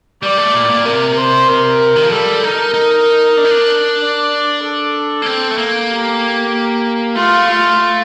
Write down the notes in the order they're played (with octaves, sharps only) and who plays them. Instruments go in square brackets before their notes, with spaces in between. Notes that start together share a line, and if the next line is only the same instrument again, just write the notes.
[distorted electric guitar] G3 [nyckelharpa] D5
[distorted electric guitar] A3
A#2
A2
A#2
[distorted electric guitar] C3 [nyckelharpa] A#4
[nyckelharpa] C5
A#4
[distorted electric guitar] D#3
F3
[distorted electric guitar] G3 [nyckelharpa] A4
[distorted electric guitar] D#4 [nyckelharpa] A#4
[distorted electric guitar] D#4
D4
D#4
D4
[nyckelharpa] D5
A4
[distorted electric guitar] A#3
C4
A3
A#3
[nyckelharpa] G4
[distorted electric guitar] A3 [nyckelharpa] F4
[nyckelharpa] F4